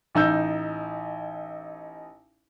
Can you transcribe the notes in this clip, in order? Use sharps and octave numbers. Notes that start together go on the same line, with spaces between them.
A1 D#4 E6 G6